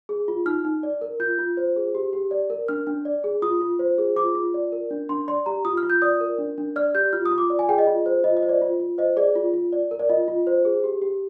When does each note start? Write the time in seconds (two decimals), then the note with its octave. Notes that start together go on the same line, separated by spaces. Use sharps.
0.09 G#4
0.28 F4
0.46 D#4 F6
0.65 D#4
0.83 D5
1.01 A#4
1.20 F4 G6
1.39 F4
1.57 C5
1.76 G#4
1.95 G4
2.13 G4
2.31 D5
2.50 A#4
2.68 D4 F6
2.87 D4
3.05 D5
3.24 G#4
3.42 F4 D#6
3.61 F4
3.79 C5
3.98 G#4
4.16 F4 D6
4.35 F4
4.54 D5
4.72 A#4
4.91 D4
5.09 D4 C6
5.28 D5 C6
5.46 G4 A#5
5.65 F4 D#6
5.77 F6
5.83 F4
5.90 G6
6.02 D5 D#6
6.21 A#4
6.39 D4
6.58 D4
6.76 D5 F6
6.95 G4 G6
7.13 F4 F6
7.26 D#6
7.31 F4
7.38 D6
7.50 D5
7.59 G#5
7.69 G#4 G5
7.78 D#5
7.87 F4
8.06 C5
8.24 F4 D#5
8.37 D#5
8.43 C5
8.49 D5
8.62 F4
8.80 F4
8.98 C5 D#5
9.17 G#4 D5
9.35 F4
9.54 F4
9.73 D5
9.91 A#4
9.99 D5
10.09 F4 D#5
10.28 F4
10.47 C5
10.65 G#4
10.84 G4
11.02 G4